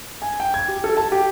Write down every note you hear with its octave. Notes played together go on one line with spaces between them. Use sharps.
G#5
G5
G#6
G4
A4
A5
G4